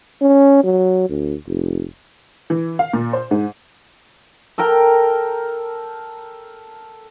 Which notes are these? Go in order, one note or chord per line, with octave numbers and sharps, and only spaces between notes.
C#4
F#3
D2
F1
E3
F5
A#2
C5
G#2
A4 A#4 G5